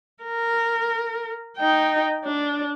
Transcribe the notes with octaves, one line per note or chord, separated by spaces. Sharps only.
A#4
D#4 G5
D4